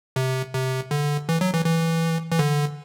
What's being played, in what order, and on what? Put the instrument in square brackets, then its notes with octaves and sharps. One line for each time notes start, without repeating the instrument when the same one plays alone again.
[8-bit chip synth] C3
C3
D3
E3
F#3
E3
E3
E3
D3